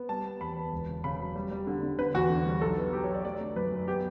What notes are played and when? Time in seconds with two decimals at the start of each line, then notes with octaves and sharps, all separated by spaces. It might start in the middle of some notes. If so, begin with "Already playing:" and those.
Already playing: B3
0.09 G3 A5
0.25 B3
0.41 E2 B5
0.56 B3
0.72 E1
0.88 C#3
1.04 C#3 B5
1.20 F#3
1.36 G3
1.51 G3
1.67 D3
1.83 D3
1.98 D3 B4
2.14 E2 F#4
2.30 D3
2.46 G3
2.61 B1 A4
2.77 B3
2.93 F#3 G4
3.04 C#5
3.09 F#3
3.14 D5
3.25 A3 D5
3.40 D3
3.56 F#2 B4
3.72 F#2
3.88 B3 G4